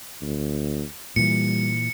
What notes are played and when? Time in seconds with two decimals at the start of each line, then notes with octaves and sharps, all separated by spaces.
0.21 D2
1.16 A#2 E3 G3 C#7